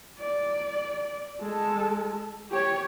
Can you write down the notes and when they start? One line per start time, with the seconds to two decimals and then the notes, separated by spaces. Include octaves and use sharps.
0.19 D5
1.40 G#3 A4
2.51 G4 C#5